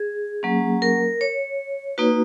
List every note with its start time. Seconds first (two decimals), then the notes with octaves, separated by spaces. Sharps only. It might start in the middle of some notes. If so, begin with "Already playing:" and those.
Already playing: G#4
0.43 F#3 A#3 C#4
0.82 A#4
1.21 C#5
1.98 A#3 D#4 F#4 B4